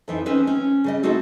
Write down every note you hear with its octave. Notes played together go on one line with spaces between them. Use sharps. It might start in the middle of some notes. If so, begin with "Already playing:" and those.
F2 E3 D#4
C4 C#4 D#4 B4 C5
C#4
C#3 G3 D#5
A3 C4 D#4 F#4 A4